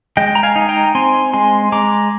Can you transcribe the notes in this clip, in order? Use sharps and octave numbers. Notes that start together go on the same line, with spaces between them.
G#3 D#5 G5
A#5
F5 G#5
D#4
G5 A#5
C4 G#5 C6
G#3 G#5 C6
G#3 A#5 D6